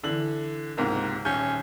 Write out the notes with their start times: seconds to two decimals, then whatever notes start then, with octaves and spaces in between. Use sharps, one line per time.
0.04 D3 E3 F#7
0.77 C#2 G#2 C3 A#3
1.25 D#1 C#4 G6